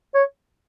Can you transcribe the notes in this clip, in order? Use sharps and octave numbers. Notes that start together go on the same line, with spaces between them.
C#5